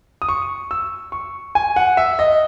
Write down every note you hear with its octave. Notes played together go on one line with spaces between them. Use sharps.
D#6
C#6
E6
C#6
G#5
F#5
E5
D#5